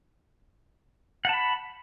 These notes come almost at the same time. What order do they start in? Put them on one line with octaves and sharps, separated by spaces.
F#5 A5 B5